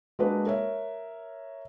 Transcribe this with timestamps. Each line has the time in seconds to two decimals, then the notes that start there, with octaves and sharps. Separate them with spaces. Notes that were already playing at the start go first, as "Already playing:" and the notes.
0.19 G#3 A#3 D4 F#4 B4
0.46 A#4 C#5 E5